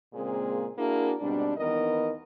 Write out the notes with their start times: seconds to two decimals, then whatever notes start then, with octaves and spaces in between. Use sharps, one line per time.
0.14 A#2 C#3 G#3 A#3 C4 G#4
0.77 A#3 D4 E4 F#4 G#4 A#4
1.20 G#2 B2 G3 C4 D4
1.57 D#2 D#3 E3 B3 A#4 D#5